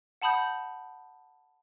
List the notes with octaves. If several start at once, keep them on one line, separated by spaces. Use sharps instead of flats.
F#5 A5 B5 D#6 G6